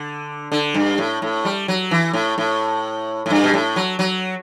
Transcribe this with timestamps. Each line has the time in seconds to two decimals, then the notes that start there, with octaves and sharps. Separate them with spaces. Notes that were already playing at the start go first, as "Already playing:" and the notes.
Already playing: D3
0.52 D3
0.74 G2
0.98 A2
1.22 A2
1.45 G3
1.68 F#3
1.91 E3
2.13 A2
2.38 A2
3.26 A2
3.30 G2
3.44 B2
3.54 A2
3.76 F#3
3.99 F#3